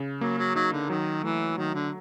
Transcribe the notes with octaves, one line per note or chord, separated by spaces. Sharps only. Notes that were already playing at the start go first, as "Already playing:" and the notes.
Already playing: C#3
F#3 A#3
F#3
F#3 D#4
D3
D#3 F#3
E3 A3
D#3 F#3
D3